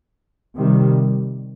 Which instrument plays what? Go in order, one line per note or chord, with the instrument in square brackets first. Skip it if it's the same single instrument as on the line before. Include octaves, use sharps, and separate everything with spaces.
[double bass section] C3 D#3 G3